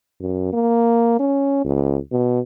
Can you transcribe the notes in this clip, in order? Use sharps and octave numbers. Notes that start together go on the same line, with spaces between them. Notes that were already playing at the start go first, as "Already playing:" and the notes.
F#2
A#3
C#4
C#2
B2